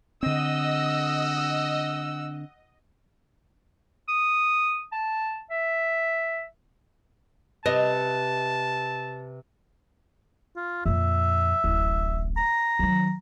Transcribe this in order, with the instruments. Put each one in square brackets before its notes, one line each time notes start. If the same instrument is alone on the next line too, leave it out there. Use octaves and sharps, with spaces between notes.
[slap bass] D3 C4 [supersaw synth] D#5 [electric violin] F#5 E6
[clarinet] D#6
A5
E5
[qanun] C3 [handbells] B4 [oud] D#5 [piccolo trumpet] A5
[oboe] F4
[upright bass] F2 A#2 [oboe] E5
[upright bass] D1 A1
[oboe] A#5
[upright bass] D#3 F#3